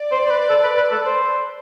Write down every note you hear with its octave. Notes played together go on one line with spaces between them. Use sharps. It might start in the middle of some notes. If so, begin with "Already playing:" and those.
Already playing: D5
C5
C5
B4
A4
B4
B4
A4
C5